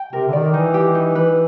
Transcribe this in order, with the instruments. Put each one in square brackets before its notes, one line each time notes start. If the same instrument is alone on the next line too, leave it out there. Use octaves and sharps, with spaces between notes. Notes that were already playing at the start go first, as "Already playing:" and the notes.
Already playing: [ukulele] G5
[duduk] C3 [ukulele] A#4
[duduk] D3
[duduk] D#3 [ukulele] D5
[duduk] E3 [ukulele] D#4
[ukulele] G4
D#4
[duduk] E3 [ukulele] B4